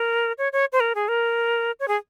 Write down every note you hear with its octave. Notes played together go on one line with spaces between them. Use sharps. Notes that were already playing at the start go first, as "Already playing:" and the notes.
Already playing: A#4
C#5
C#5
C5
A#4
G#4
A#4
C#5
G#4